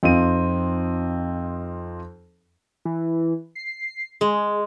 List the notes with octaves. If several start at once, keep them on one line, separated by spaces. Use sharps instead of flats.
F2 C4 D#4 F4 D#7
E3
C7
G#3 G#4